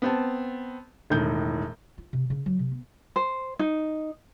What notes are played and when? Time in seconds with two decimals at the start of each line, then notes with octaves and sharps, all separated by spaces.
0.02 B3 C4 A5
1.10 E1 A2 D#3 G6
1.98 F4
2.13 C3
2.30 C#3
2.46 F#3
2.59 C3
2.72 B3
3.16 C5
3.59 D#4